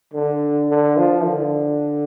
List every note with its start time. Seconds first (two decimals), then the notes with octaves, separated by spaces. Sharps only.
0.13 D3
0.70 D3
0.97 F3
1.25 D3